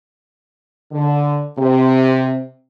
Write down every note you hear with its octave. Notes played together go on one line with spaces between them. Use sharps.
D3
C3